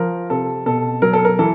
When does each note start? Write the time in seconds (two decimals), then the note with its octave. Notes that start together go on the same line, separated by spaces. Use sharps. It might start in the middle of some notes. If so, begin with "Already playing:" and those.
Already playing: F3 A#4
0.30 C3 A4
0.66 B2 A4
1.02 F#3 A#4
1.13 A4
1.25 A#4
1.39 E3 A4